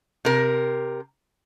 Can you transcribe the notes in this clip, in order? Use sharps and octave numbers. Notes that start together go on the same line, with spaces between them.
C3 A#4